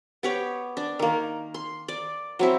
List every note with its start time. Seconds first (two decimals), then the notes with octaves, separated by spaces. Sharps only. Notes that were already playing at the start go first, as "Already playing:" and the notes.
0.23 B3 G4 C#5
0.77 D4
0.99 D#3 A#3
1.54 C6
1.88 D5
2.39 F#3 C4 E4